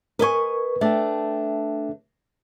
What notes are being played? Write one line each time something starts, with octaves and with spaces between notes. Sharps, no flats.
A#4 B4 D#5 G#5 C#6
A3 D4 E5 G5